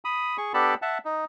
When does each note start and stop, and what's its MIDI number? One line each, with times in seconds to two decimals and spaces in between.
0.05 0.37 83
0.05 0.37 87
0.38 0.53 68
0.38 0.53 85
0.54 0.74 59
0.54 0.74 62
0.54 0.74 67
0.54 0.74 69
0.54 0.74 81
0.54 0.74 83
0.82 0.98 76
0.82 0.98 78
0.82 0.98 81
1.05 1.25 63